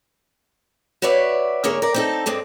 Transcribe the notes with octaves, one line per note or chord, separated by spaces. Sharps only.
F#4 B4 C#5 D5 E5
G#2 D3 A#3 G#4 C#5 E5
A#4 D5
C4 D#4 A4
G2 G#3 C4 D4